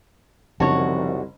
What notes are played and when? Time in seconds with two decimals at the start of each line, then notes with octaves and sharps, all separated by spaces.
0.60 F#1 C2 D#3 F3 C4 F#4 C#5 A5